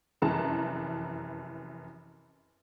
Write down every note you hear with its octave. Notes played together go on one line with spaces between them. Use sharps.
F1 F#2 E3 A5 A#5